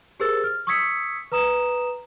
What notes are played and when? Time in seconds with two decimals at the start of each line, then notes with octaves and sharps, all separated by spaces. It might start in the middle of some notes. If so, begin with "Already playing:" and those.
0.20 G4 G#4 A#4 C5 E6 A6
0.44 F6
0.67 C#6 D#6 E6 G#6 B6 C#7
1.32 B4 A#5 D#6 E7